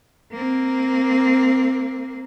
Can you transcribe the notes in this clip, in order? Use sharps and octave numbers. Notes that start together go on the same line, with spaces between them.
A#3 C4